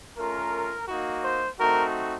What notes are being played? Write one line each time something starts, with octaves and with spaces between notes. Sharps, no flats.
A3 C#4 F4 A#4
A#3 D#4 F#4
C5
A3 C4 D#4 F#4 A#4